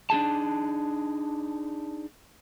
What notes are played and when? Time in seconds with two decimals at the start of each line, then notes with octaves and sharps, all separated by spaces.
0.10 D4 D#4 G#4 A5